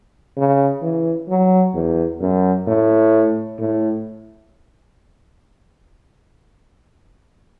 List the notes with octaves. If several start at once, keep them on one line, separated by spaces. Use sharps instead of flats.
C#3
E3
F#3
E2
F#2
A2
A2